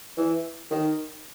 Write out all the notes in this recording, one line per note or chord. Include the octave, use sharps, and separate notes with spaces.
E3
D#3